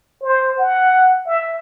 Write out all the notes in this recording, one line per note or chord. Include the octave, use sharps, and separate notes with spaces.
C5
F#5
E5